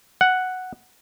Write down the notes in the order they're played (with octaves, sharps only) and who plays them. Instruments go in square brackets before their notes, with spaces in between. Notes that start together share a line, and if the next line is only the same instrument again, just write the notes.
[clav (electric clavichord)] F#5